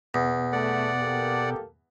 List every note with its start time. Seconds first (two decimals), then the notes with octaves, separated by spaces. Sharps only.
0.14 E2 B2
0.52 A3 D5 F#5
1.01 A#3 G4 A4